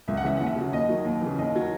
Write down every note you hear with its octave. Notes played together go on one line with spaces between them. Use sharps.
C#2 E5
F#5
C#3 E3 E5
D#2 F#5
E5
C#3 F#3
D#2 D#5
D#3 F#3
D#2
C#3 E3
D#2 D#5
D#3 F#3